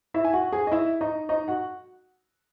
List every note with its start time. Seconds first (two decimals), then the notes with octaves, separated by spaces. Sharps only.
0.14 E4 E5
0.25 G#5
0.33 F#4 F#5
0.52 G#4 G#5
0.67 D#5
0.71 E4 E5
1.01 D#4 D#5
1.29 D#4 D#5
1.48 F#4 F#5